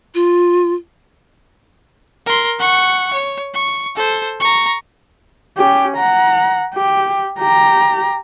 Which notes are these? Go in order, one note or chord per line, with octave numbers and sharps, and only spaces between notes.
F4
A#4 C6
F#5 C#6
C#5
C#6
A4 C5
A#5 C#6
C#4 G4
F#5 A#5
G4
G4 A#5